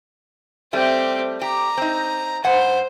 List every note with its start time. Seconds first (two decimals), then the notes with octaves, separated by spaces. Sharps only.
0.73 G3 A3 C4 G4
1.42 G4 A#5
1.77 C4 D#4
2.44 G2 C5 F#5